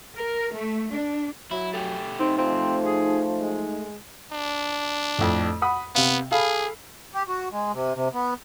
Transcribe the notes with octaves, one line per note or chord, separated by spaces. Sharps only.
A#4
A3
D4
F#3 E4
A3 G4
C4 D#4
F3 C4
G#4
G#3
D4
F2 A2
F#5 B5 D#6
C3 B3 F5
G#4 A4 F5 B5
G4
F#4
G#3
C3
C3
B3